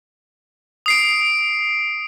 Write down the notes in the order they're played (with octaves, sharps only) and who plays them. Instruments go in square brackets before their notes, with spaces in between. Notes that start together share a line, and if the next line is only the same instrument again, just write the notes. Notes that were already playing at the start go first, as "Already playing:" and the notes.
[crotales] D#6 C7 D7